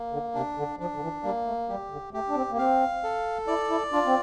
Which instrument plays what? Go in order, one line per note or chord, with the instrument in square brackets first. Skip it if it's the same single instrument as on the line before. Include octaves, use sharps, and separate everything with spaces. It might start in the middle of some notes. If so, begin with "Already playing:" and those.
Already playing: [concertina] A#3
[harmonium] D3
[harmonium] C3 [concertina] D4
[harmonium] D3
[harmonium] F3 [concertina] D4
[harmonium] D3
E3
[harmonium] G3 [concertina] A#3
[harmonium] A3
[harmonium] G3 [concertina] G4
[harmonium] D3
[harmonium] A3 [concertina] G4
[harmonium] D4
C4
A#3
[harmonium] C4 [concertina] F5
[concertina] A4
[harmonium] E4 [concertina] D5
[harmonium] E4
[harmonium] D4 [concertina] F4
[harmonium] C4